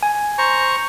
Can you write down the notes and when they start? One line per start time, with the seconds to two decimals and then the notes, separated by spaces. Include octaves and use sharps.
0.03 G#5
0.38 C5 A#5 C#6